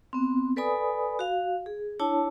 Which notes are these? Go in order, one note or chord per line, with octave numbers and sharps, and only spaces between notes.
B3 C4
A4 B4 D5 G#5 B5 D#6
F#4 F5
G#4
D4 E4 C#5 A5